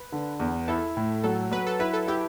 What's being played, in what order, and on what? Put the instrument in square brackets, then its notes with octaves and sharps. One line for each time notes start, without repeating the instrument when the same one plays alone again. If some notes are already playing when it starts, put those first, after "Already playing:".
Already playing: [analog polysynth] B4
[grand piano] D3
E2
[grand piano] E4 [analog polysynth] A4
[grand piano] A2
[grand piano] F#3 [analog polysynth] A4
[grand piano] F#3 [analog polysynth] B4
[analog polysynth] A4
[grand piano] E4 [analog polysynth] B4
[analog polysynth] A4
[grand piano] E4 [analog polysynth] G4